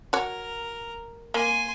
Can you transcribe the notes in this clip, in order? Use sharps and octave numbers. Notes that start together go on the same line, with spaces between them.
F#4 A#4 C#5
A#3 G#5 C6